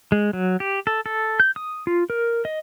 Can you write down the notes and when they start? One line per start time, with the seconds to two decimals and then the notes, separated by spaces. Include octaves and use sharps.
0.12 G#3
0.33 F#3
0.60 G4
0.87 A4
1.06 A4
1.40 G6
1.56 D#6
1.87 F4
2.10 A#4
2.45 D#5